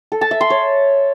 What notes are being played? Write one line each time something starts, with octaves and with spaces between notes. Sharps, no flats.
A4
A5
E5
C6
C#5